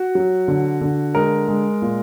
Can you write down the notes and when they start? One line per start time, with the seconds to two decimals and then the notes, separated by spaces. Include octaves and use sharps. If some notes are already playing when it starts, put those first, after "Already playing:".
Already playing: F#4
0.15 F#3
0.48 D3
0.81 D3
1.15 G#3 A#4
1.48 G#3
1.82 A#2